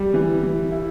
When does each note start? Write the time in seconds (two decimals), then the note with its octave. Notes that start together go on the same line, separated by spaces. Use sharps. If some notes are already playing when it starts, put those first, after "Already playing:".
Already playing: G3
0.14 E3
0.43 E3
0.72 E4